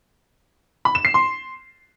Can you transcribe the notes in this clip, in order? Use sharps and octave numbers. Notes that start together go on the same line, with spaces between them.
B5
E7
C7
C6